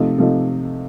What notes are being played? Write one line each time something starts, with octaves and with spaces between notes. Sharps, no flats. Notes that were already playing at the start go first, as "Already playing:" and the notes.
Already playing: C3 F3 A3 D#4
C3 F3 A3 D#4